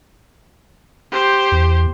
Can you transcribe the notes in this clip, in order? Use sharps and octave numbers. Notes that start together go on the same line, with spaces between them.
G4 C5
E2